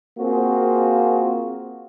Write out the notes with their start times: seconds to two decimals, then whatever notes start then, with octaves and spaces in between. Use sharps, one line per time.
0.18 A#3 C4 F4 F#4 G#4